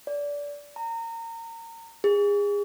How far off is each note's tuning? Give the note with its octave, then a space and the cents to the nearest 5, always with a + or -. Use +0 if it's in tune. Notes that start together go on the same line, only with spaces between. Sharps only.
D5 -25
A#5 -25
G#4 -30